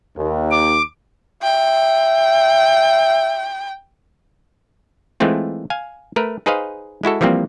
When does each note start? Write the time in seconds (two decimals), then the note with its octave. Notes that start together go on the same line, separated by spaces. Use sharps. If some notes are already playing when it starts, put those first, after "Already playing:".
0.17 D#2
0.51 D6
1.43 E5 G5
5.20 E3 G#3 A3 C4 F4
5.70 F5 G#5
6.16 A3 A#4 B4
6.46 D#4 G#4 B4 C5 D#5 F5
7.03 G#3 E4 F#4 A4
7.21 E3 F3 G3 A#3 C4